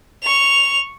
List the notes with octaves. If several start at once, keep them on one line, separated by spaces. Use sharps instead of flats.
C#6 F7